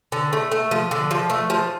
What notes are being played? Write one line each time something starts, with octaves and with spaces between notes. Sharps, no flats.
D3
A3
A3
F3
D3
F3
A3
F3